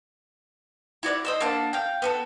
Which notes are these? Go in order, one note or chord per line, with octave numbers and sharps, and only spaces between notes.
E4 F#4 D5 F#5
C5 D#5 E6
A#3 D4 F#5 A5
F5 G5
B3 F#4 A4